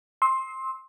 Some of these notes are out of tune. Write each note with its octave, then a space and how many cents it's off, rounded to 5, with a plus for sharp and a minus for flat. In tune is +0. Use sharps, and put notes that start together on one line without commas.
C6 +15 E6 -35